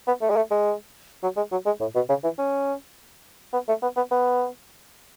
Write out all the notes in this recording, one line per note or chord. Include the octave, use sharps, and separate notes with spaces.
B3
A3
G#3
A3
G#3
F#3
G#3
F#3
G#3
A2
B2
C#3
E3
C#4
B3
A3
B3
B3
B3